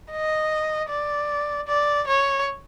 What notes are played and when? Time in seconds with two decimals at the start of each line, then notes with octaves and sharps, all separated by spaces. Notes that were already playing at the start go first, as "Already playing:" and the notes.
0.11 D#5
0.89 D5
1.68 D5
2.07 C#5